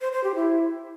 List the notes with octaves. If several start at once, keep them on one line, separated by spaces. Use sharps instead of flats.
C5
C5
G4
E4